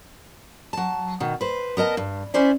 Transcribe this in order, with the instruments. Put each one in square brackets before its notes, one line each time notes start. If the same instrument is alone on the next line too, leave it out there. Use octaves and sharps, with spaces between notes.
[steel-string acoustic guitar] F#3 A5
B2 D#3
B4 C5
B3 A#4 D#5 A5
G2
C#4 E4 C5 D5 E5